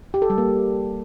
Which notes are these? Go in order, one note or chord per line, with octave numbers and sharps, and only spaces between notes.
G4
A4
G3
A#3